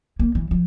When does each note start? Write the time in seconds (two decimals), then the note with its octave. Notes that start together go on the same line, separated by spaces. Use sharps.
0.19 A#3
0.35 E3
0.51 F3